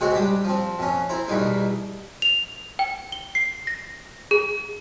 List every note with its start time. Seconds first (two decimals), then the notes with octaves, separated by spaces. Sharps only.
0.01 C#2 G#3 C4 F#4 C5
0.15 G3 D4 G4
0.44 F3 C4
0.79 F2 C#4
1.09 C4 E4 C5 A#5
1.28 E2 B2 G3 D#4 A#4
2.22 F7
2.79 G5
3.12 G7
3.35 C7
3.67 A#6
4.31 G#4